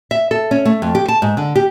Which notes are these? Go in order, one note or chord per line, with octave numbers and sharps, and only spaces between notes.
E5
A4
C#4
A3
F2
G4
A5
G#2
D3
G4